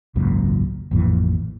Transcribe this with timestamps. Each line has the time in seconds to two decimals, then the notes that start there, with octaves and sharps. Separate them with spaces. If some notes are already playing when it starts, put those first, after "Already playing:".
0.15 G#1 C#2 F#2 A#2
0.91 A1 F2 A#2 E3